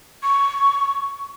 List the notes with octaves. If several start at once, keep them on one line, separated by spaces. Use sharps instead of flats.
C#6